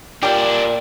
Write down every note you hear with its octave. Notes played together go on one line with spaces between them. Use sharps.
A#2 G3 D4 E4 G4 D5